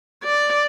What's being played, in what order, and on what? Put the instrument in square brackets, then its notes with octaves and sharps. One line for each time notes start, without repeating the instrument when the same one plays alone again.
[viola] D5